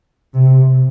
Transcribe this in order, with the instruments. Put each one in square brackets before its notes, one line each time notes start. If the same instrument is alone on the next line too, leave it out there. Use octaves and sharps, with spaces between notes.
[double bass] C3